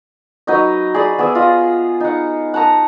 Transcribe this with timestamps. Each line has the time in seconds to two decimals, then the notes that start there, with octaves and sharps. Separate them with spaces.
0.47 F#3 D#4 B4 D#5
0.94 G#4 D5 B5
1.19 B3 G#4 D5 E5
1.35 F4 D#5
2.00 D#4 F#5
2.54 F#5 A5 A#5 D#6